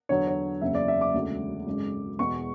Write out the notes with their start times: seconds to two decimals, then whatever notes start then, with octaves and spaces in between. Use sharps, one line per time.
0.09 E2 D3 F#3 C#5
0.28 C#5
0.62 F#1 E2 C#3 E5
0.75 D5
0.88 E5
1.01 D6
1.14 E1 D2 C#3 G#3
1.67 G#1 F#2 C#3 G#3
2.19 E1 E2 B2 G#3 C#6